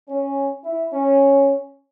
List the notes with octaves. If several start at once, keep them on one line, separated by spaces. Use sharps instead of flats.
C#4
E4
C#4